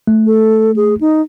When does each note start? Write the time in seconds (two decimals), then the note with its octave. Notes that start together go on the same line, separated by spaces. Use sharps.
0.07 A3
0.26 A4
0.76 G#4
1.01 D#4